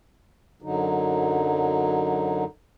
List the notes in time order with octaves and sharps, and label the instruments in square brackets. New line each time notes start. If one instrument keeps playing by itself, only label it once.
[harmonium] F#2 D3 F#3 D#4